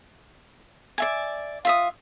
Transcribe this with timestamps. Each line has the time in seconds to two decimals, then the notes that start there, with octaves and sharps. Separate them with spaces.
0.98 D5 E5 G#5
1.65 F4 E5 D#6